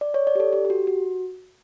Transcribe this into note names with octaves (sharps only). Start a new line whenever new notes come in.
D5
C#5
D5
G4
A4
G4
G4
F#4
F#4